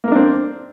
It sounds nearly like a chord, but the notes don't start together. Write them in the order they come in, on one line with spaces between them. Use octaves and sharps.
A#3 A#4 D4 C4